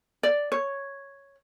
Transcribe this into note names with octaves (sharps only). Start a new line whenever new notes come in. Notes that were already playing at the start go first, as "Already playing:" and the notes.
D5
C#5